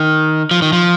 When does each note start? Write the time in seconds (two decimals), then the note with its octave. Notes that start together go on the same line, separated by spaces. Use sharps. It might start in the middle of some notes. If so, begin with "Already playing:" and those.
Already playing: D#3
0.51 F3
0.62 D#3
0.73 F3